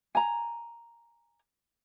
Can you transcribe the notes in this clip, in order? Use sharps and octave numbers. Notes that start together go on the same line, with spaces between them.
G#5 A#5